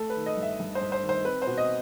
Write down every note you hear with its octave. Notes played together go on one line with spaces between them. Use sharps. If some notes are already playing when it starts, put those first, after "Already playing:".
Already playing: A3 A4
B4
D#3
D#5
G2
E5
G2
C5
G2
C5
D#3
C5
C4 B4
C5
B2
D#5